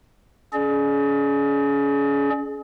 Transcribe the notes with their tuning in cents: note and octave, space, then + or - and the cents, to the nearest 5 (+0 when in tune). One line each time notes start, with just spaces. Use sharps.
C#4 +25 G#4 +30 D5 +35